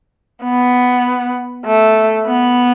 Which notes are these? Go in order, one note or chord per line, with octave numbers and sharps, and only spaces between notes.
B3
A3
B3